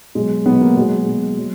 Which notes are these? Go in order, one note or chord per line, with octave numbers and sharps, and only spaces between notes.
B2 F#3 G#3
B2 F#3 B3
A#3
B2 F#3 G#3
B2 F#3
F#3